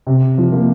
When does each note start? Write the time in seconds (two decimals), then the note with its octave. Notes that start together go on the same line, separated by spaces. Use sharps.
0.07 C3
0.38 F3
0.52 A#3